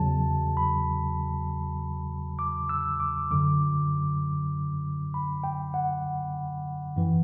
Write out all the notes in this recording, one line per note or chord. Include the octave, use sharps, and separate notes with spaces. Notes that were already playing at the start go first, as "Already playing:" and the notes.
Already playing: E2 C#3 F#3 A5
B5
D6
E6
D6
F#2 D3 F#3 D6
B5
G5
F#5
F#2 E3